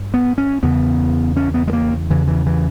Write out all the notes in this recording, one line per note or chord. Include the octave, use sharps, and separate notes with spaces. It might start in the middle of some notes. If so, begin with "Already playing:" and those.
Already playing: G2
B3
C#4
E2 C#3 B3
C#4
B3
G#3
A#3
E2 C#3 E3
E3
E3